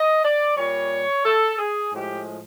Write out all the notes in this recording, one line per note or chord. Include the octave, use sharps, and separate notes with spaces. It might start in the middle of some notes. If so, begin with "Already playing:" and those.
Already playing: D#5
D5
A#2 G3 C#5
A4
G#4
A2 F3 G#3 G4